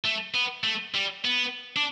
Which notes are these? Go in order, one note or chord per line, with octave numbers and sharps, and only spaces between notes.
A3
B3
A3
G3
B3
D4